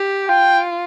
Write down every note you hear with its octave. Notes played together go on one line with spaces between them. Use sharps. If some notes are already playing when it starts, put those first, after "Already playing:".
Already playing: G4
F4 G5